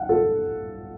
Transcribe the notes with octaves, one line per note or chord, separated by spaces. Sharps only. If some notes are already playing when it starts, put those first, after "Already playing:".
Already playing: F5 F#5
A4